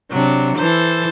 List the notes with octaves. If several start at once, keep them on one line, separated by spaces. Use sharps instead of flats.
C3 F#3 D4
E3 A4 C5